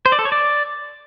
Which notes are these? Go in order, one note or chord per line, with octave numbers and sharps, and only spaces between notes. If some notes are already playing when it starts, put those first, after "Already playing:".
C5
D5
A4
C#5
D5